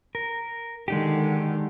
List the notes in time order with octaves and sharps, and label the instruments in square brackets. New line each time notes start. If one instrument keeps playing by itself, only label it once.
[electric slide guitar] A#4
[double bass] D3 D#3 [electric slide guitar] G#3 D#4 G4